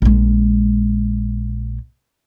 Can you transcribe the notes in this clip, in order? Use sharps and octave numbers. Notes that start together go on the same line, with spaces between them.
A#1 G#3